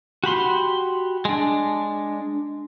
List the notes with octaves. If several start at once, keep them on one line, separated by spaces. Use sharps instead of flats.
F#4 G4 B5 C6
G#3 D4